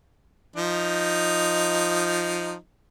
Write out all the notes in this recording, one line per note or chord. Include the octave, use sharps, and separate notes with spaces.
F3 D#4